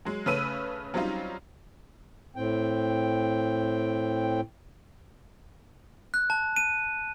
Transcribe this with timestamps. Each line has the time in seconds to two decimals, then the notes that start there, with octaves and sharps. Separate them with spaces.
0.05 F#3 G#3
0.26 C#3 A3 C#4 B4 E6 D#7
0.94 F#3 G3 C4 C#4 D#4 F4
2.36 A2 C4 G5
6.14 F#6
6.30 A5
6.56 D#7